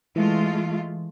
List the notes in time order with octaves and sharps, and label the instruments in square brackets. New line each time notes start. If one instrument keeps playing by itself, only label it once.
[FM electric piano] E3 [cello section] G#3 A3 F4